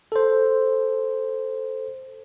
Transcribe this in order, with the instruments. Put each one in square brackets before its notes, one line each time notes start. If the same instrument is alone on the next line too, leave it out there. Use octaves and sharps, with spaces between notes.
[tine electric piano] A4 C5